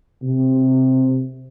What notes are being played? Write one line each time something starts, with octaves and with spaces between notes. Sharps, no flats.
C3